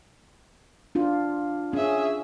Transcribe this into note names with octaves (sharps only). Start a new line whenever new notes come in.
D4 F4
C#4 G#4 E5